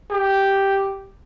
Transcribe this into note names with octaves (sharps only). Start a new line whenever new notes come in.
G4